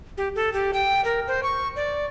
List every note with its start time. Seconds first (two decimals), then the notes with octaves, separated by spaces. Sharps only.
0.18 G4
0.35 A4
0.53 G4
0.73 G5
1.05 A#4
1.28 C5
1.43 C#6
1.76 D5